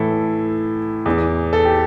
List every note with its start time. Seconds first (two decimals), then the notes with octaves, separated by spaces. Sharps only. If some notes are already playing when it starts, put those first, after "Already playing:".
Already playing: A2 E3 E4 A4
1.06 E2 E3
1.53 A4
1.65 G4